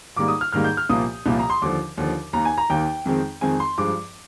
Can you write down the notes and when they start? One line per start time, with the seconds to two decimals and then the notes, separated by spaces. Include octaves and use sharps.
0.16 G#2 D#3 G3 A#3 D6
0.28 D#6
0.41 F6
0.52 G#2 D#3 G3 A#3 F6
0.64 G6
0.77 F6
0.89 C2 A#2 F3 A#3 D#6
1.26 C2 A#2 F3 A#3
1.39 A#5
1.50 C6
1.62 D#2 D3 F3 D6
1.97 D#2 D3 F3
2.33 D#2 D#3 A#3 A#5
2.45 G#5
2.58 A#5
2.70 D#2 D#3 A#3 G5
3.06 F2 D#3 G#3 C4
3.41 F2 D#3 G#3 C4 G#5
3.60 C6
3.78 G2 F3 G#3 D6